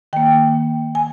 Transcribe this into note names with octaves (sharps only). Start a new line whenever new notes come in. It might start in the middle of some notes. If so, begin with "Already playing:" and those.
D#3 A#3 G5
G#5